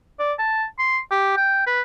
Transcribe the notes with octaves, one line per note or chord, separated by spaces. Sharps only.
D5
A5
C6
G4
G5
B4